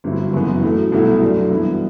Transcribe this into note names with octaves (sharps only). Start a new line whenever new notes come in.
G1 G2 F#3 C4 E4
F#1 F#2 E3 B3
A2 F#3 A3
C2 B2 F#3 A3 E4
F#2 F#3 A3 D4
G2 E3 B3 E4